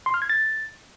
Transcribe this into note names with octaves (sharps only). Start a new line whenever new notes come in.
C6
F6
G#6
A6